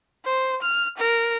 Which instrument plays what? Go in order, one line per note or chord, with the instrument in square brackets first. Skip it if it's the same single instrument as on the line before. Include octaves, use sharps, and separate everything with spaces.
[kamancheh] C5
F6
A#4